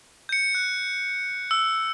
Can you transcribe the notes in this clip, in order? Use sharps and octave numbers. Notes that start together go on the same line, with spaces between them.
G6 C#7
F#6
E6